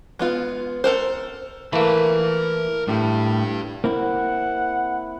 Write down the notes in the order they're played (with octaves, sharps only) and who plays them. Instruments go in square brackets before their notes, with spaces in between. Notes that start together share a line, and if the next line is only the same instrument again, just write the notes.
[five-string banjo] G#3 B3 F4
A4 A#4 C5
[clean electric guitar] E3 [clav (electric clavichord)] A3 A#3 [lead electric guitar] A#4 B5
[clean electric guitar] A2 [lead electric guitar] D4 G4
[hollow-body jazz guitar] A#3 C4 E4 [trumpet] F#5